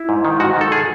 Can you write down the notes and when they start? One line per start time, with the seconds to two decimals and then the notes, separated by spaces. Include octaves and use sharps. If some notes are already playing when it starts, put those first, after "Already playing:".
Already playing: E4
0.09 G#2
0.25 D#3
0.40 G#2 F#4
0.57 D#3 A4
0.72 G#4